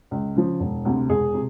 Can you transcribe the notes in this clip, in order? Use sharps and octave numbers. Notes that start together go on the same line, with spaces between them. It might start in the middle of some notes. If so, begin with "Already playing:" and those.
C#2
C#3 F3
E1
D2 C3
E1 G#4
C3